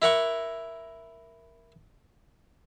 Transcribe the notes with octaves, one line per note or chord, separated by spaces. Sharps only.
E4 A#4 F#5 C#6